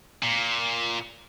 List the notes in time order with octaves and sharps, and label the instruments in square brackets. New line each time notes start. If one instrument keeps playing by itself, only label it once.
[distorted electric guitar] A#2